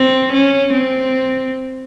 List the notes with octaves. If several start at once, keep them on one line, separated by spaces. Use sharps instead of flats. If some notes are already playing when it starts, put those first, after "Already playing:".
Already playing: C4
C#4
C4